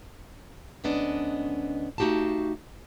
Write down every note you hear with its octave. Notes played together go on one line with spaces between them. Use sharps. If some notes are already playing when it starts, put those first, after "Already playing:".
D2 G#3 B3 C#4 D4 D#5
A3 D#4 F#4 G4 F5 A5